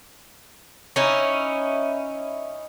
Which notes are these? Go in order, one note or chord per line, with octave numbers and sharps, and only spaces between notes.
C#4 D#4 E4